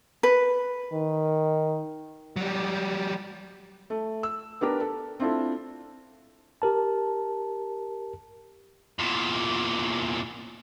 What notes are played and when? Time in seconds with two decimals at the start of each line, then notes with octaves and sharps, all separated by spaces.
0.23 B4
0.93 D#3
2.36 F#3 G3
3.90 A3
4.23 E6
4.61 B3 D4 G4 A#4
4.81 A4
5.20 C4 D4 E4 F4 A4
6.62 G4 A#4 A5
8.99 E2 A#2